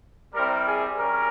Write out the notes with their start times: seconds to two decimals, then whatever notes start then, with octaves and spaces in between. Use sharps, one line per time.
0.35 G3 C4 E4 A#4
0.67 G#4
0.98 G3 C#4 A#4